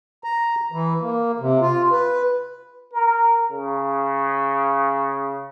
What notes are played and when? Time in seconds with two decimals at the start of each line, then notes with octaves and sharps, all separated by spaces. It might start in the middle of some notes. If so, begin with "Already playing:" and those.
0.24 A#5
0.72 E3
1.01 A#3
1.40 C3
1.61 F4
1.92 B4
2.92 A#4
3.52 C#3